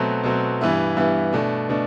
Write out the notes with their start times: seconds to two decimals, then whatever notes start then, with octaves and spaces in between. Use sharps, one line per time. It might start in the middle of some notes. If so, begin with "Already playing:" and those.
Already playing: B2 F#3 A3 C4
0.24 B2 F#3 A3 C4
0.61 G2 E3 B3 E4
0.97 G2 E3 B3 E4
1.33 B2 A3 D4
1.69 B2 A3 D4